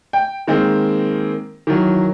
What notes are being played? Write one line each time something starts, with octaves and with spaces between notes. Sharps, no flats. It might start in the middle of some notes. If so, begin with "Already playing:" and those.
G5
D#3 G#3 A#3 C4
D#3 E3 F#3